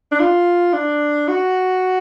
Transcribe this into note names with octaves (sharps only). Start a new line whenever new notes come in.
D4
F4
D4
F#4